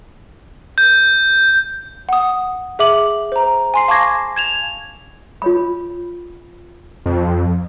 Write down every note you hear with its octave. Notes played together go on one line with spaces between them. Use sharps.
G6
F#5 D#6
G#4 E5 D6 F#7
C5 A#5
G#5 C6 C7
F5 A5 C#6 D6 G#6 A#6
G#6 E7 F7
F4 C#5 B5
F2